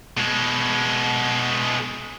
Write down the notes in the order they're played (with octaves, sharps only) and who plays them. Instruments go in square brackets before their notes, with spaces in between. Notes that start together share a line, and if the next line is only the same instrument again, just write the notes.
[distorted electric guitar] B2 G#3